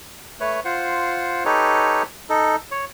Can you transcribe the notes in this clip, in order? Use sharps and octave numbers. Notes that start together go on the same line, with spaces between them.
A3 B4 C#5
F4 C5 F#5
D#4 G4 A4 B4 C#5
D#4 A4
C#5